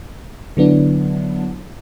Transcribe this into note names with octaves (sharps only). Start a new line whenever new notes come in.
D3 F#3 B3 D4 E4